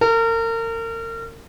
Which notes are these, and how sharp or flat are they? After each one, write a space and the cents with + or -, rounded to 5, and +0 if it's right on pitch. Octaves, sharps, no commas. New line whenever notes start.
A#4 -35